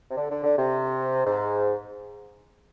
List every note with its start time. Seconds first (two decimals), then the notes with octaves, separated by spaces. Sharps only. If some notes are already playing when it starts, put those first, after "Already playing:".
0.10 C3
0.16 D3
0.30 D3
0.43 D3
0.57 C3
1.26 G#2